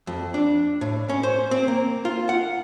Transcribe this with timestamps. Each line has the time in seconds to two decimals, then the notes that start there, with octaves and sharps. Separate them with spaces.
0.07 F2
0.34 D4
0.81 A2
1.09 C#4
1.23 C5
1.51 C4
1.68 A#3
2.05 F4
2.29 F#5